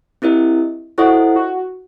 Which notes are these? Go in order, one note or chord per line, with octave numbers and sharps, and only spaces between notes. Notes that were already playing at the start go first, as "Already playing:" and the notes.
C4 E4 G4 A#4 D#5
E4 F#4 A4 C5 D#5 F#5
F#4